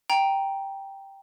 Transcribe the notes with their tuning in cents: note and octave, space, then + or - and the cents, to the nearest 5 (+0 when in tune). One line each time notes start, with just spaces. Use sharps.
G5 +0 A#5 +10